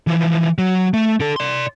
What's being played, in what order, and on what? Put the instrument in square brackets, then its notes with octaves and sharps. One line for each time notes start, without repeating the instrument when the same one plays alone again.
[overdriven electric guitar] E3 F3
F#3
A3
D3 A4
D5 C6